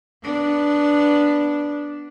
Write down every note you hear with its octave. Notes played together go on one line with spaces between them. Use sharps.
B3 D4